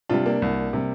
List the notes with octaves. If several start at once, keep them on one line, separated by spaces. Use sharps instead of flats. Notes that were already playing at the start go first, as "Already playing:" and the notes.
C3 G3 D4 F4
A#3 D4
C2
C3 G3